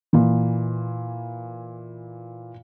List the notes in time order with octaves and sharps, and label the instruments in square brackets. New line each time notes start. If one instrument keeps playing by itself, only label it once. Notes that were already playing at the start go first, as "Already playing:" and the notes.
[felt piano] A#2 E3